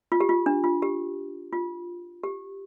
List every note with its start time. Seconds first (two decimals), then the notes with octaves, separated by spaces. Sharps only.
0.12 F4
0.20 G4
0.29 F4
0.46 D4
0.64 F4
0.82 G4
1.53 F4
2.24 G4